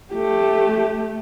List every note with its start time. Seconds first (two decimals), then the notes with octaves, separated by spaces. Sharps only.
0.15 A3 G4